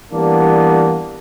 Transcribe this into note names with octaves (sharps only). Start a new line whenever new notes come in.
E3 G3 A#3 B3 D4